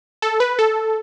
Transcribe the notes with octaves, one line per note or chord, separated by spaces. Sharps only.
A4
B4
A4